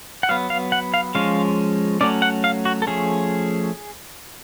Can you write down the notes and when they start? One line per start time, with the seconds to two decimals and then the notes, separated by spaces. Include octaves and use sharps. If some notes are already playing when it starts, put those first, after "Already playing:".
0.23 F#5
0.29 F#3 B3 F5
0.50 F5
0.72 F#5
0.94 F5
1.15 F3 G#3 C#4 F5
2.01 F#3 A3 C#4 D5
2.22 F#5
2.44 F5
2.65 F#4
2.82 A4
2.87 F3 A3 C#4 G#4